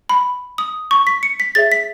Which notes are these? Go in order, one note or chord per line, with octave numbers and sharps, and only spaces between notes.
B5
D#6
C#6
B6
C#7
B6
G#4 C#5 E5 A6
B6